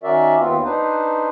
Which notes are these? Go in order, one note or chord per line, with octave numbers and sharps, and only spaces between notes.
D#3 C#4 F#4 A#4 D5 E5
D#2 B3 C4 F4
D4 D#4 B4 C5